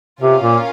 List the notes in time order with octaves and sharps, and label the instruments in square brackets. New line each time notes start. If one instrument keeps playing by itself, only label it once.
[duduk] C3 [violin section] C#4 F4 A#4 F5
[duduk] A#2